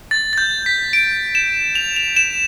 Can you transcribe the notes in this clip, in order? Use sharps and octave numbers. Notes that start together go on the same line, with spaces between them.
A6
A6
G6
B6
D7
E7
F7
F7
E7